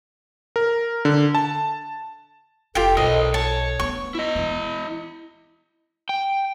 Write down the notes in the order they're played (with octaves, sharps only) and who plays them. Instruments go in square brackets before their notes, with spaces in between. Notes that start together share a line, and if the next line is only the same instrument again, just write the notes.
[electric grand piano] A#4
D3
A5
[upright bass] F1 [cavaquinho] F4 G4 G5 [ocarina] A4
[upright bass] B1 [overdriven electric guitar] A#4 C5 [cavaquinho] D#5
[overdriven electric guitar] C#5 [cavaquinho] A5
[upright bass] A3 D4 [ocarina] B3 [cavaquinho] C#6
[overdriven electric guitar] E4 D#5
[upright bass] E3 G#3
[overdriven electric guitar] G5